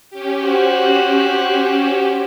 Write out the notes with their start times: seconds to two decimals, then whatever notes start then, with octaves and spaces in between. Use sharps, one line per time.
0.10 C#4 G4
0.45 F#4 C5